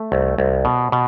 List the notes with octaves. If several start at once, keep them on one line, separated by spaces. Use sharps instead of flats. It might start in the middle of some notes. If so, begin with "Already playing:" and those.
Already playing: A3
C2
C2
B2
B2